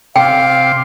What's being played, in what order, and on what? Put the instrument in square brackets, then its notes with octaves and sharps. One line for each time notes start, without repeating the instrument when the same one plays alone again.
[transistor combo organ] C3 C6 D6 [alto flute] F5 [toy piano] G5